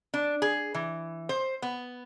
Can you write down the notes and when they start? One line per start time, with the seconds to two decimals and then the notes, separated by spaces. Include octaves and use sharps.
0.14 D4
0.42 G#4
0.74 E3
1.29 C5
1.62 B3